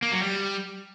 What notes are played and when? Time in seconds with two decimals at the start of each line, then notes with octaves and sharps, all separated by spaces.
0.02 A#3
0.12 F#3
0.21 G3